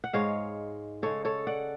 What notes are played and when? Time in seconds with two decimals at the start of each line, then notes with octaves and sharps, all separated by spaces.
0.04 F#5
0.13 G#2 G#3 C#5 F5
1.02 C#3 G#3 A4 C#5
1.25 A4 C#5
1.47 D5 F#5